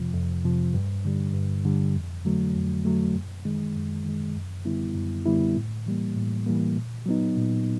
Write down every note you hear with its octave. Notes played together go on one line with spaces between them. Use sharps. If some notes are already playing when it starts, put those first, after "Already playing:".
Already playing: F2 C3 F3
F2
C3 F3
G2
D3 G3
G2
D3 G3
F2
D3 F#3 A3
F2
D3 F#3 A3
F#2
D#3 G#3
F#2
D#3 G#3
F#2
D3 G3 B3 E4
F#2
D3 G3 B3 E4
A2
E3 G3 A#3
A2
E3 G3 A#3
A#2
F#3 B3 D#4
A#2